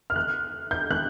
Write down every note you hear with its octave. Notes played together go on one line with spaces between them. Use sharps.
F6
F#6
G6
F#6